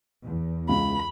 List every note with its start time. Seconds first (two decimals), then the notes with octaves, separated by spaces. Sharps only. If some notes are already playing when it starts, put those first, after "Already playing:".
0.23 E2
0.69 C#2 B5